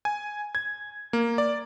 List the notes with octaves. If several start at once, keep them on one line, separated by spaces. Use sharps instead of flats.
G#5
G#6
A#3
D5